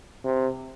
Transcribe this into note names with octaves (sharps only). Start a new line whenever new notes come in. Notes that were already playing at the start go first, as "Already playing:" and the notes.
C3